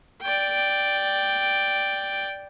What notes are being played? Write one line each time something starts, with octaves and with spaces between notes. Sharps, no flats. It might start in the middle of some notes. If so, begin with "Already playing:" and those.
D5 G5